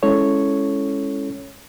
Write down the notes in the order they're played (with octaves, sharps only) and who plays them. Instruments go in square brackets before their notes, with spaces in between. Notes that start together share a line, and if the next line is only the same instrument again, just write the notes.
[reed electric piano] G#3 C#4 E4 A4 C#5